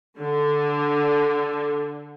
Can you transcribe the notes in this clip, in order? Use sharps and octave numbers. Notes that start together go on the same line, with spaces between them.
D3